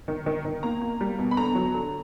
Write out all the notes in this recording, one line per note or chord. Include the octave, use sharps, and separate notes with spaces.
D#3
D#3
D#3
A#3 A#5
A#3
G3
B2
B5
D3 A#5
F#3
D3